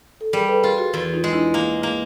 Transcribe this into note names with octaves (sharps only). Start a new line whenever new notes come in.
A4
G3 G#4 A#4
A4 B4
F4 G#4 A#4
F#4 G#4
E2
D#4 F4
G#3
D4 E4
A#3
A#3